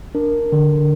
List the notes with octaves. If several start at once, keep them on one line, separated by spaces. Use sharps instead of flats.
D4 A#4
D3